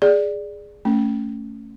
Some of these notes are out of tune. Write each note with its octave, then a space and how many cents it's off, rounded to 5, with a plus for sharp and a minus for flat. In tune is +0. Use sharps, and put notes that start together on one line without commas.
G#4 +0 D5 +0
A3 +15 C#4 +0